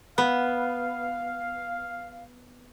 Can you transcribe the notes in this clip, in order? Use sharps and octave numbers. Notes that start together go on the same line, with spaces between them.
B3 F5